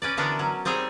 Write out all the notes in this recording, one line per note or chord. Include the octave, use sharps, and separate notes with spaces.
C#4 B4 D5
D3 E3 B3 D4 F#4 A#4
F#3 C#4
G3 C4 D#4 G#4 C#5